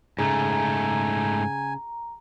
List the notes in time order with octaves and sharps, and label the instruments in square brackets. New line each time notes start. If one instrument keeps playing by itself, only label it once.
[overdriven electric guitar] G#2 A3 [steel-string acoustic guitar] C#3 [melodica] G#5 [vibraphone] A#5